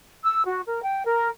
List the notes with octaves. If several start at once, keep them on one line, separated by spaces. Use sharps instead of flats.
E6
F#4
A#4
G5
A#4